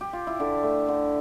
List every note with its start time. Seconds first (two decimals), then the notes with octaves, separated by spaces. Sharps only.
0.01 G4
0.13 F4
0.27 E4
0.39 D3 D4
0.63 A3
0.88 D3